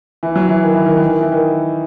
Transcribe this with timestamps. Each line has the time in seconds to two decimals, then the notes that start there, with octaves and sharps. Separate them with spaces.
0.23 E3
0.36 F#3
0.49 E3
0.63 D#3
0.74 E3
0.86 D#3
0.97 E3
1.09 D#3
1.21 E3
1.32 D#3